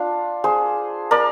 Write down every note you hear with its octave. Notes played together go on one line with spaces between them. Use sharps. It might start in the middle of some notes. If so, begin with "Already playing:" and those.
Already playing: D4 F4
G#4 C5
A#4 D5